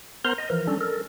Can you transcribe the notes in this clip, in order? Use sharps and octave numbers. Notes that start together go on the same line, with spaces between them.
B3 A#4 C5 A#5 C6
D#5
E3 F3 A#4
G3 C#4 D4 A4
A4 A#4